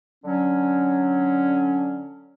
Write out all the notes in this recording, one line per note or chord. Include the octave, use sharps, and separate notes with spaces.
D3 F#3 C#4